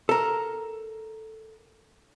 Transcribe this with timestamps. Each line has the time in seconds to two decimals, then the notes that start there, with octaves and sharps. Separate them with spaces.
0.09 A4 A#4